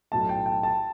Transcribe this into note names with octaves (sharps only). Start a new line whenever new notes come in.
B1 A2 F#3 A3 A5
G5
G5
A5